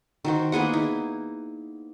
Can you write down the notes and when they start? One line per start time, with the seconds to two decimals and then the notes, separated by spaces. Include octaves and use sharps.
0.25 D#3 F#4 C5
0.52 A#3 B3 G#4 F#5
0.73 D#4 E4